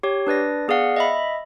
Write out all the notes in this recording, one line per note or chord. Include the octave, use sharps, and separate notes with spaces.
G4 C#5
D4 B4 D5 A#6
B3 G#4 D5 F5 F#5
D#5 E5 B5